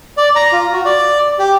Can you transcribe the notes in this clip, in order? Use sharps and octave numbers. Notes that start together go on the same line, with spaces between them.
D5
A#5
F4
F#4
D5
G4